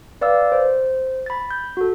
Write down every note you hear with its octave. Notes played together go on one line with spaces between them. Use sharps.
B4 D5 F5 E6
C5
B5 A6
G6
F#4 A4